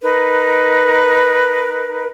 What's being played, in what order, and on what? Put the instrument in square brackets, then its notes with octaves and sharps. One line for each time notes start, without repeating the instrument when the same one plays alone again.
[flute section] D#4 A#4 B4